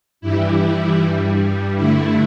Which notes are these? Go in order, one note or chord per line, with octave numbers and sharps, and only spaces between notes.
G2 E3 G3 E4
G2 G3
G2 D3 A3 E4